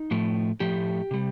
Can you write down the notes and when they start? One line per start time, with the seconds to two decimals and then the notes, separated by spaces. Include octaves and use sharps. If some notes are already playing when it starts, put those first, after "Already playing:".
Already playing: D#4
0.11 A2 F3 A3
0.60 A2 F3 A3 G4
1.11 C3 G3